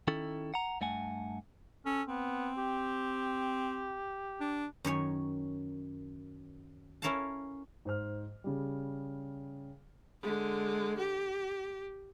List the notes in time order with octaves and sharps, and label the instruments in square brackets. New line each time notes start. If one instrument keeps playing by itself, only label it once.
[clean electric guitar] D#3 C#4 E4 A4
F#5 A#5
G2 A3 F#5 G#5
[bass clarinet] C#4 [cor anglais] A4
[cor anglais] B3 [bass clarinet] C4
[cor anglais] G4
[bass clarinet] D4
[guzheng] F#2 D#3 C#5 G#5
C#4 E4 A#4 C#5 F5 A5
[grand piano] G#2 C5 F6
C#3 G3
[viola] D3 G#3
G4